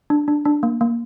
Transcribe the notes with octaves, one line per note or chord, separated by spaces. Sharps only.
D4
D4
D4
A#3
A#3